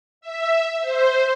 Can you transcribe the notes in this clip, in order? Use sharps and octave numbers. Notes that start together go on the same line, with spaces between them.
E5
C5